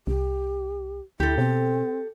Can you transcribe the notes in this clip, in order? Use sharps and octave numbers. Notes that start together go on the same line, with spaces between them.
C2 G4
D2 E4 G4 A4
B2 C4